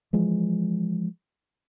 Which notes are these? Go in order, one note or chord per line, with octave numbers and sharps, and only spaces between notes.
E3 F3 G#3